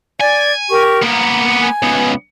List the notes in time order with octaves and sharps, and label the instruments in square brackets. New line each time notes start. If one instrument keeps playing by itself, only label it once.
[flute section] D5 [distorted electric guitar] G#5
[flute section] G4 A#4 C#6
[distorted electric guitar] A#3 B3 [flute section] A#5
[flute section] G#5
[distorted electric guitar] C#2 B3